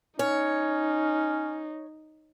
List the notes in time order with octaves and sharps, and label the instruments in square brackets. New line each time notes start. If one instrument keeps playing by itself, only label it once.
[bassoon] C#4 [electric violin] D#4 [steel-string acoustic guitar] C#5